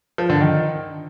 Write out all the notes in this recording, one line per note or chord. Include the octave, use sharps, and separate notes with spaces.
F3
D3
D#3